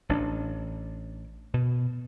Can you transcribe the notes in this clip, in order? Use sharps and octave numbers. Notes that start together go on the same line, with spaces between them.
A1 D4
B2